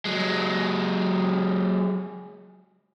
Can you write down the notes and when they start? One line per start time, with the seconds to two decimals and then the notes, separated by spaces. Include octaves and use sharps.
0.05 F#3 G#3